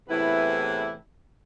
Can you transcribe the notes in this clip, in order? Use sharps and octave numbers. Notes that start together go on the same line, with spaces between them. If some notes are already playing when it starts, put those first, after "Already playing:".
E2 A2 C3 E3 E4 B4